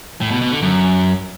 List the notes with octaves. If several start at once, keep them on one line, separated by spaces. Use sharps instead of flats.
A2
B2
B2
D3
F#2